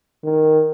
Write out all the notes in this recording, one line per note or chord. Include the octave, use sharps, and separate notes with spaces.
D#3